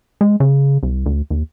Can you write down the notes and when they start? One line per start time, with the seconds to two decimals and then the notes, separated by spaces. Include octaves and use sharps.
0.21 G#3
0.40 C#3
0.83 C2
1.06 D2
1.30 D#2